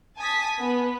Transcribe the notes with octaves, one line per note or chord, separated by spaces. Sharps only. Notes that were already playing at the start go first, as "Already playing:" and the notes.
G#5 A5 D#6 B6
B3